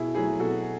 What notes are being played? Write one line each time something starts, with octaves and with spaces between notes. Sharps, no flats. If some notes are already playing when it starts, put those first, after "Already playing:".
Already playing: B2 E4 G#4
F#3 A3 E4 G#4
B2 F#4 A4